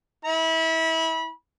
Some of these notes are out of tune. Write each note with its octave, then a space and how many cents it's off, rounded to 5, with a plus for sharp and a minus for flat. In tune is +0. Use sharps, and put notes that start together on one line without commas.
E4 -25 B5 -25